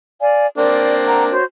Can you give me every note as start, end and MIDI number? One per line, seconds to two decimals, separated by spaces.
0.21 0.46 74
0.21 0.46 77
0.21 0.46 80
0.58 1.35 58
0.58 1.35 60
0.58 1.35 62
0.58 0.94 74
1.07 1.23 78
1.07 1.23 82
1.31 1.43 66
1.31 1.43 72
1.31 1.43 73